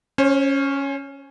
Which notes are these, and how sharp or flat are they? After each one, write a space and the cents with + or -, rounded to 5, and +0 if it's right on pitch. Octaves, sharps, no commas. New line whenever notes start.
C#4 +0 C5 +40